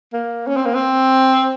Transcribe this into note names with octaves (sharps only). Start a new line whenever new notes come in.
A#3
C#4
C4
A#3
C4